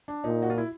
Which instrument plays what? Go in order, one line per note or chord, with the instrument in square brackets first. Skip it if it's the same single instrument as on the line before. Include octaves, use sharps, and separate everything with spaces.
[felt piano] D4
[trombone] A#2 [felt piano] D#4
[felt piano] F#4
F4
E4